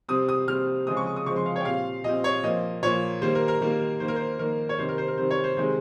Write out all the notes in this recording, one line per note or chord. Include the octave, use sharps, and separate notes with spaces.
C3 G3 C4 D#6
D#6
C3 G3 C4 F6
C#3 F3 G#3 C4 D#6
C#6
D#6
D#6
C#3 F3 G#3 C4 C#6
C6
F5
C#5
G5
A#2 G3 C4 F5
A#2 G3 C4 D#5
C#5
A#2 F3 A#3 D#5
A#2 F3 A#3 C#5
D#3 G3 A#3 C5
A#4
A#4
D#3 G3 A#3
D#3 A#3 C5
A#4
C5
D#3 A#3 A#4
C#5
C3 D#3 G3 C4 C5
A#4
C5
A#4
C3 D#3 G3 C4 C5
C#5
C5
C3 D#3 G#3 C4 C5